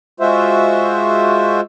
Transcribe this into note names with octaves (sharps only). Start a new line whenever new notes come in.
G#3 F4 F#4 C5 E5